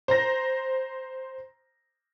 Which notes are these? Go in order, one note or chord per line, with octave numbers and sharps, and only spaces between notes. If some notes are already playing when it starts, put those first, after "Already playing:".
C5 A#5 A#6